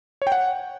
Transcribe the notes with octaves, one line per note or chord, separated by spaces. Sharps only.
C#5
G5
F#5